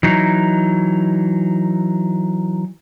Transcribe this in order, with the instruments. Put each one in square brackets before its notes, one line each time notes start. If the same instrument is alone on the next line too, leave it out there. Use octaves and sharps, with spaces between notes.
[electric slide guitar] E3 F#3 D#4